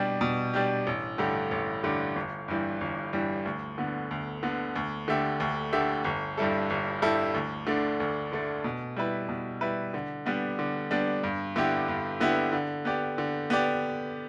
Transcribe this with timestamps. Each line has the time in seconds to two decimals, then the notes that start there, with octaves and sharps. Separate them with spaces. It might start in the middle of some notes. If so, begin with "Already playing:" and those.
Already playing: B2 G3 D4 G4
0.21 B2
0.54 G3 D4 G4
0.87 A1
1.18 G2 D3 A3 G4
1.51 A1
1.83 G2 D3 A3 G4
2.16 G1
2.48 G2 E3 G3
2.81 G1
3.13 G2 E3 G3
3.46 D2
3.78 D3 B3
4.11 D2
4.43 D3 B3
4.76 D2
5.08 D3 A3 G4 E5
5.40 D2
5.73 D3 A3 G4 E5
6.04 G1
6.38 G2 G3 E4 A4
6.70 G1
7.02 G2 G3 E4 A4
7.35 D2
7.67 D3 A3 D4
8.00 D2
8.32 D3 A3 D4
8.64 B2
8.96 G3 E4 B4
9.29 B2
9.61 G3 E4 B4
9.94 D3
10.26 G3 B3 D4
10.59 D3
10.91 G3 B3 D4
11.24 G2
11.56 D3 B3 E4 G4
11.88 G2
12.20 D3 B3 E4 G4
12.52 D3
12.85 B3 G4 D5
13.18 D3
13.50 B3 G4 D5